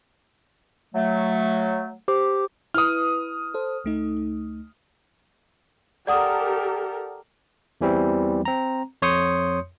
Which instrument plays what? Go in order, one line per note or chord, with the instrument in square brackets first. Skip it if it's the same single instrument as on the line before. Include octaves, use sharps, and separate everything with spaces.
[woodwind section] F#3 A3
[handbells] G4 C5 D6
[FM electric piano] E4 B4 [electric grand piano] D#6 F6
[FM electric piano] A4 C5
D2 A3 D#4
[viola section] G4 A4 A#4 [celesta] D5 F#5 D#6
[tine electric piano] E2 E3 G3 C4
C4 A#5
F2 C#5 C6 D#6 G6 C#7